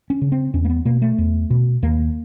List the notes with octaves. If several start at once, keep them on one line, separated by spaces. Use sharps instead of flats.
C#4
C#3
C4
E2 C#4
A#3
B3
B2 A#3
A3
E2
B2
D#2 A#3